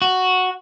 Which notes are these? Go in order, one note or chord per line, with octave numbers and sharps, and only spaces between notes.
F#4